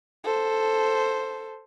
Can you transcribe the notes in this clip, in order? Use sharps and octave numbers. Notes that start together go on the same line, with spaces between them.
A4 C5